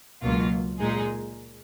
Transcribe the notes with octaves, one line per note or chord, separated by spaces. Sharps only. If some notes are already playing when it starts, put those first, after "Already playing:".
C#2 B2 F#3 A#3 F4
A#2 G#3 D#4 G#4